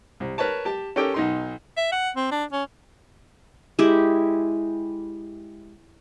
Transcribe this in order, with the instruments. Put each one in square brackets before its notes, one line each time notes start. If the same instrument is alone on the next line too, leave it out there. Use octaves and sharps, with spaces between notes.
[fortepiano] C2
A#4 B4 C#5 A5
G4 A5
C#4 G4 A4 A#4 G5 D6
B1 D#4 C6
[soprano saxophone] E5
F#5
C4
D4
C#4
[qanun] G#3 E4 G4